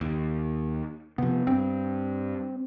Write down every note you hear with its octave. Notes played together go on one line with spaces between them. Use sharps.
D#2
C3 F3 B3
G2 C4